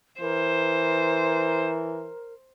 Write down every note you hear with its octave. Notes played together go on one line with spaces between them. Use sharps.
E3 A#4 C5